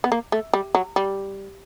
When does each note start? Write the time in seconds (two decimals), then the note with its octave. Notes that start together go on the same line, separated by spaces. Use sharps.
0.04 B3
0.12 A#3
0.32 A3
0.53 G3
0.75 F#3
0.96 G3